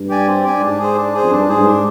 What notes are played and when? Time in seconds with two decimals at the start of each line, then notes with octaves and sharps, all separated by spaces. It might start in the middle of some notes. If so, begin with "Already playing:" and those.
Already playing: G2
0.09 G4 D5 G#5
0.27 C4
0.44 G4 D5 G#5
0.57 G2
0.61 G#2 D4
0.79 G#4 C5
0.96 D4
1.14 G#4 C5
1.23 F2
1.31 G2 D4
1.48 G#2 G#4 C5
1.57 G2
1.64 G#2 D4